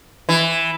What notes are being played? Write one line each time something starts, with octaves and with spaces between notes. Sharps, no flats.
E3